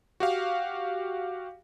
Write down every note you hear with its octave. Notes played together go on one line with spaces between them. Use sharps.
F#4 G4 F5